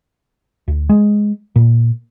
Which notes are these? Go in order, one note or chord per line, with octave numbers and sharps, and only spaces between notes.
D2
G#3
A#2